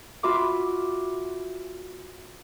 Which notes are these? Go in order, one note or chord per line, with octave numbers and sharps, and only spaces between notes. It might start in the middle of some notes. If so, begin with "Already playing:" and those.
F4 F#4 E5 B5 C6 D6